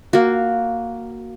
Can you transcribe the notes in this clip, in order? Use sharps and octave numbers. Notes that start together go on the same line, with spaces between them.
A#3 F#4